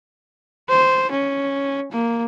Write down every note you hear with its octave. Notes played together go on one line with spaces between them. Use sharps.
C5
C#4
A#3